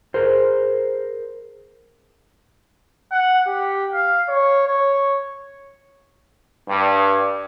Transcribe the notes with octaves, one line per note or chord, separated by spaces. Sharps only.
G#4 A#4 C5
F#5
G4
F5
C#5
C#5
G2